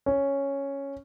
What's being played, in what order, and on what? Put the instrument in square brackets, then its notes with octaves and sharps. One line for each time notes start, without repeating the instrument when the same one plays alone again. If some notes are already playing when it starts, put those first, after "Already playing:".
[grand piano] C#4